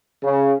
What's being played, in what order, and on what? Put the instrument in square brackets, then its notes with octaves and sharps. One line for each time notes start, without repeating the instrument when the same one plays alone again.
[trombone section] C#3